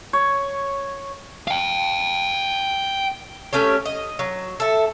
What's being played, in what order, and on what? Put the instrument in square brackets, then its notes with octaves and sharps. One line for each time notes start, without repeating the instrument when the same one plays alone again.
[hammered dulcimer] C#5
[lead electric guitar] F5 G5
[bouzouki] A3 C#4 G4 C#5
D#5
F#3
A4 E5